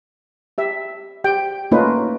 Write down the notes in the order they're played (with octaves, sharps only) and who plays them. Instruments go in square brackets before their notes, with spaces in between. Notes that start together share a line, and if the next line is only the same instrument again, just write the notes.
[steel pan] G4 E5
G4 G5
A3 A#3 C#4 D#4 F4 B4